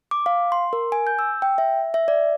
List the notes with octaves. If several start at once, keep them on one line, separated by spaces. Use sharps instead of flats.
D6
F5
C6
A#4
G#5
G6
E6
G5
E5
E5
D5